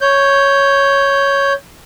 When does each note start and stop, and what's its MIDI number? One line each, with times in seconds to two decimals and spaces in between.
0.01 1.53 73
0.01 1.53 91